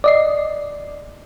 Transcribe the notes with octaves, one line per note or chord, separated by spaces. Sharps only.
D5 D#5 C7